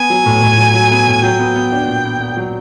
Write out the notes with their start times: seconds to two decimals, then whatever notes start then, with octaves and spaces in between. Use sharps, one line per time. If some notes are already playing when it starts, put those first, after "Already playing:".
Already playing: B3 G#5
0.10 F#3
0.26 A2
0.42 A2
0.58 F#3
0.74 F#3
0.91 B3
1.07 A2
1.13 G#5
1.23 F#3 G5
1.39 B3
1.56 B3
1.72 D4
1.88 A#2
2.05 B3
2.20 B3
2.37 F#3